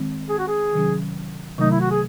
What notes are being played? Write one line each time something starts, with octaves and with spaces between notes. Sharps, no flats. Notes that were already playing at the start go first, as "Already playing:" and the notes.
Already playing: D#3 G#3 C4
G#4
F#4
G#4
C3 D#3 F#3 C#4
C3 D#3 F#3 A3 D#4
E4
F#4
G#4